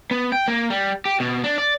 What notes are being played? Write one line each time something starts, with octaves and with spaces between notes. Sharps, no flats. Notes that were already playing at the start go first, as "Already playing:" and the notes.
B3
G5
A#3
G3
G4
B2
D4
D5